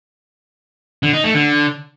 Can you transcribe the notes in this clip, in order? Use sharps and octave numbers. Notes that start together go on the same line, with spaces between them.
D3
D#4
A3
D3